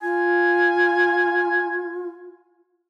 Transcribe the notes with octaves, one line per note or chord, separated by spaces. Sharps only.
F4 G#5